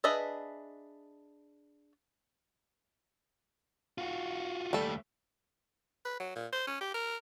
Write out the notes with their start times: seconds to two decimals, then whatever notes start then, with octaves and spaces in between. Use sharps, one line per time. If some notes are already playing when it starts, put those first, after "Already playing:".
0.04 D4 G#4 B4 D#5 E5
3.98 F4 F#4
4.73 D#2 G3 A3 A4
6.05 B4
6.20 F#3
6.36 A#2
6.53 C5
6.67 C#4
6.81 G4
6.94 A#4